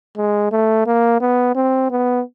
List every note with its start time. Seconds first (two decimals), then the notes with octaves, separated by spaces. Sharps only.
0.17 G#3
0.52 A3
0.86 A#3
1.21 B3
1.55 C4
1.90 B3